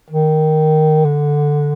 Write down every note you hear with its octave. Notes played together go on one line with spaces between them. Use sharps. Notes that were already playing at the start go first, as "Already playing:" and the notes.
D#3
D3